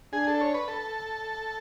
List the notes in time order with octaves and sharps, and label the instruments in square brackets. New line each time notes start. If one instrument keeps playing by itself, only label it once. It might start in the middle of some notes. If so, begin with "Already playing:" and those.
[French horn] D4 [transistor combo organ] G#4
[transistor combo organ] A4
C#5
B4
A4